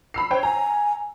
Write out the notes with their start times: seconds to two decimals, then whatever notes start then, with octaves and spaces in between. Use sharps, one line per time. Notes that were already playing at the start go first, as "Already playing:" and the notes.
0.14 B5 E6 C7
0.31 C5 C#5 G5
0.43 G#5 A#5